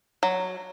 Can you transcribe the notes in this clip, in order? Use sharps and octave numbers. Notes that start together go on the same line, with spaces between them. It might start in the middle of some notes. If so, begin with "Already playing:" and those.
F#3